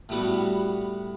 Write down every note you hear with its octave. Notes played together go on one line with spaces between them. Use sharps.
A2 G3 B3 F#4